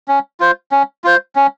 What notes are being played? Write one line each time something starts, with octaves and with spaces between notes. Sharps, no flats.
C#4
F4 C5
C#4
F4 C5
C#4